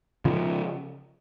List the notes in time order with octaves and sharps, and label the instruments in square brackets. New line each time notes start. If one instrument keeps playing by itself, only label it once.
[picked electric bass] C#3 F3